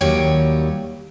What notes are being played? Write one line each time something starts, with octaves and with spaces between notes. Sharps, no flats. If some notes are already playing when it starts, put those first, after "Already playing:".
D#2 D#3 F#3 G3 C#5 G5